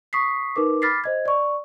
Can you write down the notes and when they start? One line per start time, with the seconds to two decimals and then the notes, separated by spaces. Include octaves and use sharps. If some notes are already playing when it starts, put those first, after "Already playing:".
0.13 C#6 D#6 B6 C7
0.56 D#4 A#4 B4 D6
0.82 B5 D6 F6 A6 B6 C7
1.04 C5 D#5 G#6
1.25 D5 C#6